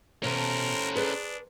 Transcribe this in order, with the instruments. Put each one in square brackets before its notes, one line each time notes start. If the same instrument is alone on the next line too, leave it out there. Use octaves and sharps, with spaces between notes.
[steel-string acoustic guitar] B2 E5 A5 [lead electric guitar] C#4 A4 [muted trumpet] A#4 [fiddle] C5 A#5
[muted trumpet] D4 [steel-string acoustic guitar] G#4 B4 D5